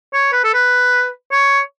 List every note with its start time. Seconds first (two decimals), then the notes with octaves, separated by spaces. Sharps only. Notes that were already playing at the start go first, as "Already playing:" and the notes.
0.13 C#5
0.32 B4
0.44 A4
0.54 B4
1.32 C#5